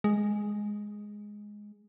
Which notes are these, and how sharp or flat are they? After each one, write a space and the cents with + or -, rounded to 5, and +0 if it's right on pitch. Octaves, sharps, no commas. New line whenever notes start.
G#3 +0